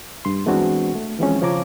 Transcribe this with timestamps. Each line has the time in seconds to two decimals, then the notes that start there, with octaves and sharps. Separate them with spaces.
0.25 G2 C6
0.46 E3 G#3 B3 C4 D4 F#4
0.95 A3
1.19 E3 F3 G#3 C4 C#4
1.41 C#3 F3 C#5 A#5 D6